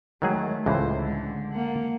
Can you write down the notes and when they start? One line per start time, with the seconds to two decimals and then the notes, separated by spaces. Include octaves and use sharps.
0.22 D#3 F#3 G#3 A3 G#4
0.66 C#2 A2 E3 C5
1.00 D3 G#3
1.53 A#3 F#5